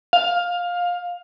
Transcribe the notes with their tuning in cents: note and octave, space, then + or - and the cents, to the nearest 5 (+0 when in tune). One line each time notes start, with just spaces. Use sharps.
F5 +15